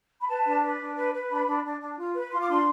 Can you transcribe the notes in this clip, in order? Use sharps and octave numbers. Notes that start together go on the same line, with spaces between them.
B5
B4 A5
D4
B4
D4
B4
B4
D4 B5
D4
D4
D4
F4
B4
F4 C6
D6
D4 C6